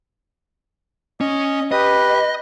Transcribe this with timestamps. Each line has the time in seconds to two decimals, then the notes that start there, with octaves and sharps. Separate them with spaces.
1.21 C#4 D#5
1.71 G4 B4 D#5